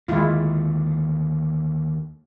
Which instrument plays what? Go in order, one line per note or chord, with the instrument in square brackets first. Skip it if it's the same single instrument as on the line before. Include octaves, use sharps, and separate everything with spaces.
[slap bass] D#2 D3 [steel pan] G#3 E4 F4